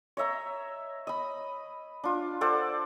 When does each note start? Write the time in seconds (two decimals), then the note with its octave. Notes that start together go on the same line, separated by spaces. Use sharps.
0.17 C#5 D#5 E5 A#5
1.07 D#5 B5
2.04 D4 F4
2.41 A4 C5 D5 F#5